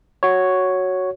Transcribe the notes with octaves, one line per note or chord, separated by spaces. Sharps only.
F#4 C#5